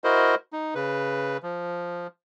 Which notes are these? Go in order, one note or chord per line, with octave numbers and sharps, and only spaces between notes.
E4 F#4 A#4 C5 D#5
D#4
C#3 B4
F3